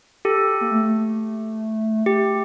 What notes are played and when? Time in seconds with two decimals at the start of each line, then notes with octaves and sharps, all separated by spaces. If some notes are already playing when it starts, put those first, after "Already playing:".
0.25 G4 A4
0.61 A#3
0.71 A3
2.06 A3 G4